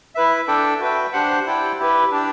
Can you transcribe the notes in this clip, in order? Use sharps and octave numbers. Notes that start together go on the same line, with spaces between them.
E4 B4 E5
D4 A4 D5 G5
F#4 B4 E5 G5
D4 G4 C5 F#5
E4 G4 D5 G5
E4 G4 B4
D4 G4 D5